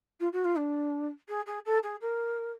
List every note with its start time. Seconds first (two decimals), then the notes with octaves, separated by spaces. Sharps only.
0.20 F4
0.32 F#4
0.44 F4
0.56 D4
1.28 G#4
1.46 G#4
1.65 A4
1.83 G#4
2.01 A#4